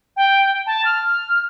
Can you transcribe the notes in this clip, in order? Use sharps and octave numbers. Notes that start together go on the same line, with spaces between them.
G5
A5
F6